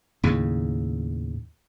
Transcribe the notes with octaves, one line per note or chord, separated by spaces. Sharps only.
D#2 A2 C#3